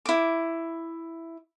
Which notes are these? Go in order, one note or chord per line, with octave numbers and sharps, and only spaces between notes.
E4 D6